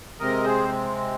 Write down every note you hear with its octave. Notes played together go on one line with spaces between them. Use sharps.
C3 G#3 C4 A#4 D#5
G#4 C5